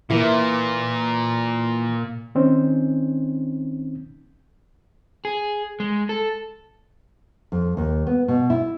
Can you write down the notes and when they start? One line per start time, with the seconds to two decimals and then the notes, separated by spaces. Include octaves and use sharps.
0.10 A#2 E3 A#3 E4
2.35 D#3 C4 C#4 D#4
5.25 G#4
5.80 G#3
6.09 A4
7.52 F2
7.77 D#2
8.07 B3
8.28 B2
8.50 E4